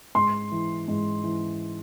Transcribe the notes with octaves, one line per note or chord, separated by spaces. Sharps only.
G#2 C6
E3
G#2
E3